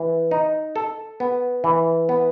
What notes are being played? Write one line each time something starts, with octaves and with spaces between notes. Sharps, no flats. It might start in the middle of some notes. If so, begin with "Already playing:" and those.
Already playing: E3
D#4
A4
B3
E3
B3